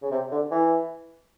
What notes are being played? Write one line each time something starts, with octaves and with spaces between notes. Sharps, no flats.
C#3
C3
D3
E3